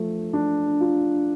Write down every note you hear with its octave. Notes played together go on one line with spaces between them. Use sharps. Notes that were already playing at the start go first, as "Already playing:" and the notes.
Already playing: F3 A3
D4
F4